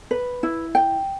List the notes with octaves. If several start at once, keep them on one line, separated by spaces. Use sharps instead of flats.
B4
E4
G5